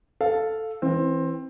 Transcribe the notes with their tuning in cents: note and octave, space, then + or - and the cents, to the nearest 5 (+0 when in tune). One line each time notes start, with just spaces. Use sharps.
A4 +0 F5 +0
E3 -5 C4 +15